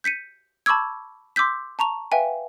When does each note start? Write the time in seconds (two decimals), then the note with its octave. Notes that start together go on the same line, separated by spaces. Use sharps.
0.04 G6 B6 C#7 D#7
0.66 A5 B5 C#6 D6 E6 G#6
1.36 C6 D6 E6 G6 B6
1.79 A5 A#5 C#6 F7
2.12 B4 E5 F5 G5 G#5